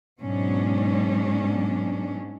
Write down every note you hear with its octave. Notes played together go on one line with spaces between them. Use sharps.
G#2 B2 F#3 C#4 D4